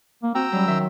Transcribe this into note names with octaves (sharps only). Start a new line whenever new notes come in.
A#3
C4 F#4 G5 A#5 E6
F#3 G3 C#4
D#3 E5 C6